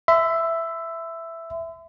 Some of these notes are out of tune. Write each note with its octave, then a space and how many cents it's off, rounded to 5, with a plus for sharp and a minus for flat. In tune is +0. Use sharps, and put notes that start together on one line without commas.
E5 +5 C6 -45